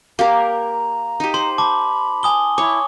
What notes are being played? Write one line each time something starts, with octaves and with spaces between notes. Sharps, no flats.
A#3 G4 A#4 A#5
D#4 G4
C5 C6
A5 B5 D6
G#5 D#6 G7
E4 C#5 D6